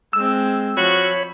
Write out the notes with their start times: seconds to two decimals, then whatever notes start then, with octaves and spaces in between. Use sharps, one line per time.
0.13 G#3 C4 E6
0.77 F3 F#4 C#5 B5